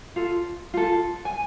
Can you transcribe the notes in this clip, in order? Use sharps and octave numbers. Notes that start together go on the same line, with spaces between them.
F4 A4
F4 A4
G#5